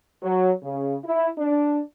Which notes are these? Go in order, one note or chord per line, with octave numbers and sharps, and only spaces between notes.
F#3
C#3
E4
D4